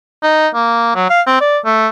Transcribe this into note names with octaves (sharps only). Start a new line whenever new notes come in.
D#4
A#3
F#3
F5
C4
D5
A3